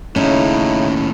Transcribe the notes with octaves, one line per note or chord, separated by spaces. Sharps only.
D#2 A2 C#3 C#4 D#4 E4